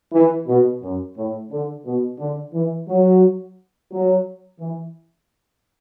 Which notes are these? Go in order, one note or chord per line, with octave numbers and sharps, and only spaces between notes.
E3
B2
F#2
A2
D3
B2
D3
E3
F#3
F#3
E3